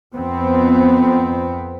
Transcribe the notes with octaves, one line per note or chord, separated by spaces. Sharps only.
F2 B3 C4